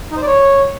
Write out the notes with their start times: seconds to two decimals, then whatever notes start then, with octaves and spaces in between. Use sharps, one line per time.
0.11 D#4
0.17 C5
0.22 D5
0.27 C#5